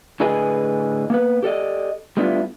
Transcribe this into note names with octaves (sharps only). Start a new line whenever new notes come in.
A2 D3 G#4 B4 D#5 G#5
A#3 B3 B4
G4 A4 D5 D#5
G3 A3 B3 D4 E4 F4